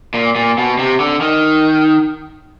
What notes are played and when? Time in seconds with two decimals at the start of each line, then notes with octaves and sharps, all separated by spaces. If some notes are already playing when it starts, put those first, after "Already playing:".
0.14 A#2
0.36 A#2
0.58 B2
0.79 C3
1.00 D3
1.21 D#3